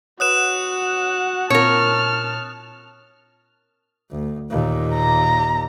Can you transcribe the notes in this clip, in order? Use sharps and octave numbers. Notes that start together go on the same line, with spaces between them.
F#4 B4 C#5 F#5 D#6 F#6 E7
A#2 C4 F4 A#4 C#5 A5 F6
D2
D#2 A#2
A#5